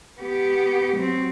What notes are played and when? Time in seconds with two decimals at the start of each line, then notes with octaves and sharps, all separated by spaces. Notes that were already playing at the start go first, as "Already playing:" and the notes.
0.20 B3 G4
0.96 F#3 C4